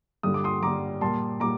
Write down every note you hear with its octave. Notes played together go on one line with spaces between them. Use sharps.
G2 D3 G3 D#6
D6
C6 D#6
G2 D3 G3 A#5 D6
A#2 G3 A#3 A5 C6
A#2 G3 A#5 D6